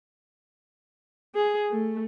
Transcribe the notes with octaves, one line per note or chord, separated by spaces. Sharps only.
G#4
A3